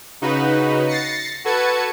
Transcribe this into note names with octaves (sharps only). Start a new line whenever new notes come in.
C#3 D#4 F#4 B4
A6 A#6 C7 C#7
F#4 A4 B4 A5 G#6 C#7